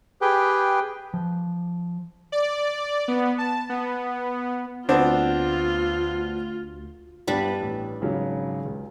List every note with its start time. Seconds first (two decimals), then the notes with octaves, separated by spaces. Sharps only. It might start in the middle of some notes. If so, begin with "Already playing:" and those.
0.21 G4 G#4 B4 G5
1.14 F3
2.32 D5
3.08 B3
3.38 A5
3.69 B3
4.89 D2 B3 C4 D4 F4
7.28 G2 G3 B3 D4 B4
7.61 A1
8.01 G#1 C#3 F#3
8.65 C#2